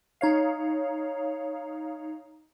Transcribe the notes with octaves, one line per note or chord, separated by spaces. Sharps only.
D#4 C#5 F5